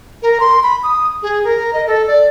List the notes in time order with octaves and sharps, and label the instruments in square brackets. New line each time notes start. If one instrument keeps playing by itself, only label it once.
[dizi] A#4
C6
B5
D#6
G#4
A#4
D#5
A4
D5